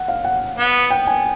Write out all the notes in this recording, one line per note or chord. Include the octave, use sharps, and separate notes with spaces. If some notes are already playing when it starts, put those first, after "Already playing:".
Already playing: F#5
F5
F#5
B3
G5
G#5